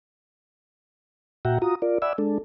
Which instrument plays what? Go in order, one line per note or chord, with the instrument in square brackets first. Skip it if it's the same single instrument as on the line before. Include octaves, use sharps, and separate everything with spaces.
[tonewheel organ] A#2 F#4 E5 F#5 G5 A#5
F4 F#4 A#5 D#6
F4 A#4 D5
D5 E5 F#5 G#5 B5 E6
G#3 D4 A4